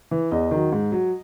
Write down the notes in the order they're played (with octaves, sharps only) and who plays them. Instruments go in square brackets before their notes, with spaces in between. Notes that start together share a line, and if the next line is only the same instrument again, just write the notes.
[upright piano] E3
E2 D#5
D#3 F#3
G#2
F#3